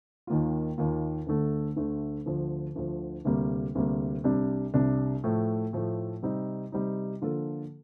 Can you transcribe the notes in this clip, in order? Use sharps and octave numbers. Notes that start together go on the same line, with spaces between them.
D#2 D#3 A#3 F4
D#2 D#3 A#3 F4
D2 D3 A3
D2 D3 A3
D2 D3 F3
D2 D3 F3
D2 C3 G3 A#3
D2 C3 G3 A#3
C2 C3 G3 D4
C2 C3 G3 D4
A2 F3 A3
A2 F3 A3
C3 G3 C4 D#4
C3 G3 C4 D#4
D3 F3 A#3 F4 A4